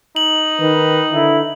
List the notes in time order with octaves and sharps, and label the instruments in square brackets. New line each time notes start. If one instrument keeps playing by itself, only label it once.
[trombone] D#4 [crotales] F#7
[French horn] D#3 [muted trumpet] B4
[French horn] D3 [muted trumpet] E4